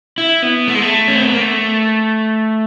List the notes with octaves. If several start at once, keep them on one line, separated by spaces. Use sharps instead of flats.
E4
B3
A3
G#3
A3
C#4
C4
B3
A#3
A3